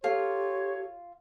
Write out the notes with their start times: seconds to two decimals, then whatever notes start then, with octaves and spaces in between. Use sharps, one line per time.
0.04 F4 G4 A4 C#5